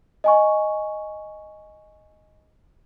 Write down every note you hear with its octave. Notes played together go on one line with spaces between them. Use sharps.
D#5 G#5 C#6